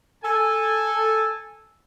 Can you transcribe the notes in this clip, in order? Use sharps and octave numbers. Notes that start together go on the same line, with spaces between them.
A4 G#5